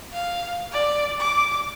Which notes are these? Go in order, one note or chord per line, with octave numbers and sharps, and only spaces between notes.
F5
D5
D6